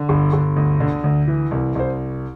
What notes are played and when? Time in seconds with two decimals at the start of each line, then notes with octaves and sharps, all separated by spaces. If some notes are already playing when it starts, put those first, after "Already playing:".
Already playing: D3
0.09 G1
0.33 G1
0.57 D2
0.80 D3
1.04 D2
1.28 E3
1.51 C2
1.75 C2 C5